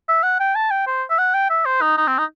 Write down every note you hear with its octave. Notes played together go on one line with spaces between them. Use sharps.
E5
F#5
G5
A5
G5
C5
E5
F#5
G5
E5
C5
D#4
D#4
C4
D#4